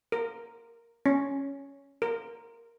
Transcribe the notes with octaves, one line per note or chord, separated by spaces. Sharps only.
A#4
C#4
A#4